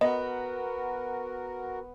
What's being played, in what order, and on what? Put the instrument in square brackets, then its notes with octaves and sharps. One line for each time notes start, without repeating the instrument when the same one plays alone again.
[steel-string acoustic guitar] B3 [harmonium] F#4 A#4 [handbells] D#5